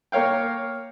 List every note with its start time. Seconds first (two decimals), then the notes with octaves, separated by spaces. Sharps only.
0.12 A#3 A#4 C#5 F5 G5